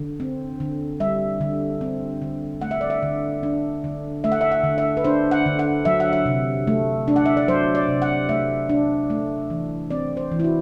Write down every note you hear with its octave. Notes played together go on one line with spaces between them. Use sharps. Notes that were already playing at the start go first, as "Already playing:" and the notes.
Already playing: D3
C4
D3
G3 E5
D3
C4
D3
A3 F#5
E5
D5
E5
D3
D4
D3
A3 E5
F#5
E5
F#5
D3
E5
B4
D4 C5
F#5
D3
F#5
F#3 E5
F#5
E5
C3
A3
D4
F#5
E5
D5
F#3 C5
D5
C3
F#5
A3 E5
D4
A3
E3
C4 D5
C5
E3
E4
F#4